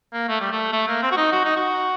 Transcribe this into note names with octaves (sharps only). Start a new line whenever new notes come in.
A#3
A3
G3
A3
A3
A#3
C4
F#4
D#4
F#4
D#4
F#4